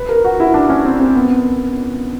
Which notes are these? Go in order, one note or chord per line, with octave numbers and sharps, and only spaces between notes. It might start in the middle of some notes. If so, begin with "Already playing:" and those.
Already playing: B4
A#4
F#4
E4
D4
C#4
C4
C4
B3